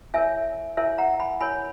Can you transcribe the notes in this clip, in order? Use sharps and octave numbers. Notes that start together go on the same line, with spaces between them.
E4 A#4 C#5 E5 G#5
E4 A#4 C#5 E5 G#5
F#5 A#5
G#5 B5
E4 A#4 C#5 G#5 B5